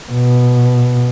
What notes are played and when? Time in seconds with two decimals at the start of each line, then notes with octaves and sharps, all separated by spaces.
0.11 B2